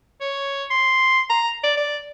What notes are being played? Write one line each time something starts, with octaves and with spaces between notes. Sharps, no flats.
C#5
C6
A#5
D5
D5